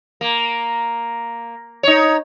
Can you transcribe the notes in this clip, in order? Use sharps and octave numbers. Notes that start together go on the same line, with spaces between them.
A#3
D#4 C#5